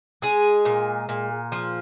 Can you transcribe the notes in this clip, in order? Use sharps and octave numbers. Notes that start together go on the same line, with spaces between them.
G#3 G#4
A#2
A#2
F3